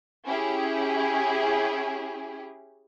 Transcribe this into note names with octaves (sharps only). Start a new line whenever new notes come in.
C#4 E4 G4 G#4